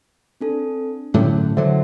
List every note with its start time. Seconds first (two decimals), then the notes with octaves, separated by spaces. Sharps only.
0.41 C4 D4 A4
1.14 A2 D3 F#3 C#4
1.57 D3 F#3 C5 E5 F#5